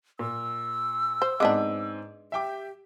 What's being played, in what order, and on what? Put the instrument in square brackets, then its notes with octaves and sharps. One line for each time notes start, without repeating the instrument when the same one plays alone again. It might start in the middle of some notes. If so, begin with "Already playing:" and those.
[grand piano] A#2 [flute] E6
[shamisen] C5
[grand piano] G#2 C4 D6 [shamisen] G#3 B3 D4
[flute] G4 [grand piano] E5 G5 D6